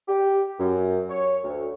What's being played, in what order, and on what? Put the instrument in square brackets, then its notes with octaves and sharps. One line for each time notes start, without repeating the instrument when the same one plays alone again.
[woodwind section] G4
F#2
C#5
D2